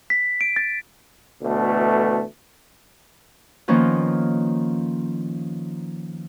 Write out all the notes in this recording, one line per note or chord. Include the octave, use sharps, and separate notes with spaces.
B6
D7
A6
D2 B2 E3 A3
D#3 F3 A#3 B3 C#4 F4